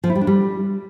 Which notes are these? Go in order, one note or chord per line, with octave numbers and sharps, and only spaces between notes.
F3
E4
G3
D4
G3